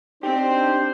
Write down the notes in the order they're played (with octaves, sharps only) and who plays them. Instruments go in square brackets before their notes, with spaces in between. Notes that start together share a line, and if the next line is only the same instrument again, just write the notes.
[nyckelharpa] C4 [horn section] D4 C5 [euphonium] D#4 [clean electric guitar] G4